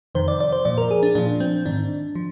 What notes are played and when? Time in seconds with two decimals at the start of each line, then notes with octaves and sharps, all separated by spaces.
0.15 F2 C3 D#3 C5
0.28 D5
0.40 D5
0.52 C5
0.65 A#2 F3 D5
0.78 A#4
0.91 G#4
1.03 D4
1.15 A#2 F3 D4
1.40 C4
1.66 G#2 D#3 D4
2.15 F3